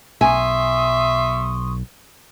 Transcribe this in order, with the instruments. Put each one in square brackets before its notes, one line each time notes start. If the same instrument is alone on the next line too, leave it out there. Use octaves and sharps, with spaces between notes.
[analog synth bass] B1 [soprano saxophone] E5 [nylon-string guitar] G#5 [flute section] C6 C#6 D#6